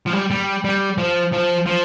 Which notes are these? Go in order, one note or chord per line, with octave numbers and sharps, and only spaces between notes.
F3
G3
G3
G3
F3
F3
F3